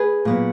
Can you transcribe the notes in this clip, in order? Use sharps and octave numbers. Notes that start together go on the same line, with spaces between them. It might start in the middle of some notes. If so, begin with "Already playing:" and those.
Already playing: G#4 B4
A#2 F#3 B3